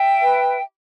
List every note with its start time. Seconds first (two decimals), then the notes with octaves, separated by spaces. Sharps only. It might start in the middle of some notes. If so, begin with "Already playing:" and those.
Already playing: E5 G5
0.20 B4